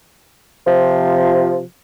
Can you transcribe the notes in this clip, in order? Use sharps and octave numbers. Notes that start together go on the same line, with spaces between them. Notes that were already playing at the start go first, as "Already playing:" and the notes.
C3 F3